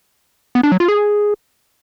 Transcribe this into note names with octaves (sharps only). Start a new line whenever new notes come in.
B3
D4
F#3
F4
G#4